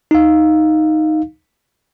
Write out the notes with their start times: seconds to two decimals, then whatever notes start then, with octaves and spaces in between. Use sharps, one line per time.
0.11 D#4 F5